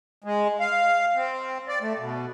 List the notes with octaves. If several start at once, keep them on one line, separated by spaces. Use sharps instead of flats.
G#3
F5
C4
D5
A3
B2